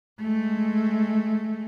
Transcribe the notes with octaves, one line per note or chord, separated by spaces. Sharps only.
G#3 A3